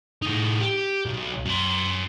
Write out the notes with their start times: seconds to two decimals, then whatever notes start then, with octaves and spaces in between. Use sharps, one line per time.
0.22 A2 D#4
0.60 G4
1.06 B1
1.46 F#2 C6